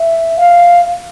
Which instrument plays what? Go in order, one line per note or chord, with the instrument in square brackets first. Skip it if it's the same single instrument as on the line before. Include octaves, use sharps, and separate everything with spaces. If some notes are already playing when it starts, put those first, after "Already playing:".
Already playing: [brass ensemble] E5
F5